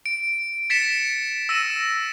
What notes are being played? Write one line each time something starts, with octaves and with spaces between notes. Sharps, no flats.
D7
A6 B6 C#7 E7
E6 A#6 D#7 E7